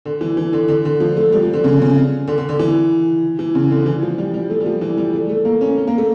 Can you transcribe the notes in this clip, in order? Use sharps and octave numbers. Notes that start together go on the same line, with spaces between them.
D3
E3
E3
D3
D3
D3
F3
A3
G3
F3
D3
C#3
C#3
D3
D3
D3
E3
E3
C#3
D3
E3
F3
G3
G3
A3
G3
F3
E3
G3
A3
A3
A#3
C#4
C#4
A#3
A3